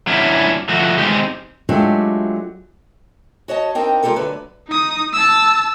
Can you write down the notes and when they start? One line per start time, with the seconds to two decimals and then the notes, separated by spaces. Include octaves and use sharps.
0.07 F#3 C#4 D4 E4
0.69 F3 A3 F#4
0.98 G#3 C4 D#4 G4
1.69 F#3 G#3 A3 D4 F4 G4
3.48 F#4 C#5 D#5 A5
3.75 C4 D4 D#4 A#4 G5
4.03 G#3 F4 G4 A4 A#4
4.16 D3 F#3 A3 B4
4.68 D#4 D#6
5.13 A5 E6